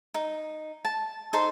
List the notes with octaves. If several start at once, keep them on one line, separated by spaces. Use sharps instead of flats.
D#4
A5
D#4 A4 C5 C6